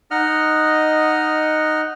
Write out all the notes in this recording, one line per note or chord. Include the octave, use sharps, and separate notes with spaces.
D#4 D#5 F#5 F6